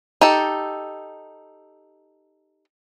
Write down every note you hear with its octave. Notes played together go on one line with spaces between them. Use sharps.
D#4 G4 A4